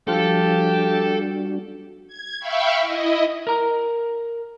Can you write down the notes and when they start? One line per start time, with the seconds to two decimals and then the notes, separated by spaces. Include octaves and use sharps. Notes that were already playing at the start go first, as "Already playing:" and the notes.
0.08 F3 G3 D4 F#4 G4 A4 F5
2.07 G#6
2.40 E5 F5 G5 B5 C#6
2.81 E4 D#5
3.47 A#4 A#5